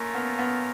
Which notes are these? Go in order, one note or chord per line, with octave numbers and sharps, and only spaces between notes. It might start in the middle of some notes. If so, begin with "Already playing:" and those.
Already playing: A3 A#3 C#4 F4 A#4
B3
B3